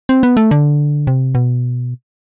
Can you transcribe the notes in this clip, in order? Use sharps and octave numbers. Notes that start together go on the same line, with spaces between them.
C4
B3
A3
D3
C3
B2